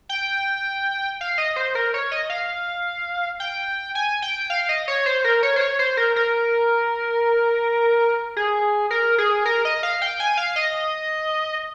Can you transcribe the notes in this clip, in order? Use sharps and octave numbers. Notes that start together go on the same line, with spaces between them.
G5
F5
D#5
C5
A#4
C#5
D#5
F5
G5
G#5
G5
F5
D#5
C#5
C5
A#4
C#5
C5
C#5
C5
A#4
A#4
G#4
A#4
G#4
A#4
D#5
F5
G5
G#5
F5
D#5